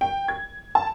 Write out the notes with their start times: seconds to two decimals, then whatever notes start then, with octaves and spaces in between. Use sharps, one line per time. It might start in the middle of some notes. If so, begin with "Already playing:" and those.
0.01 G5
0.28 G#6
0.75 A5